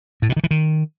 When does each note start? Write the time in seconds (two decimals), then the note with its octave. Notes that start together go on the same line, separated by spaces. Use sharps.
0.22 A2
0.29 B2
0.36 D#3
0.44 E3
0.51 D#3